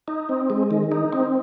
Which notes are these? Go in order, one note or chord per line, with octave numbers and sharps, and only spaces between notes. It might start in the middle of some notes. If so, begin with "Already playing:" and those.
D#4
C4
G#3
D#3
D#4
C4